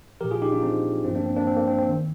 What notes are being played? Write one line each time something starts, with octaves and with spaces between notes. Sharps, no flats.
A#2 F3 G4 A#4
F4 G#4
D#4 G4
D4 F4
C4 D#4
G2 F3 C4
A#3 D4
C4
A#3 D4
C4
A#3
C4
C4
D#3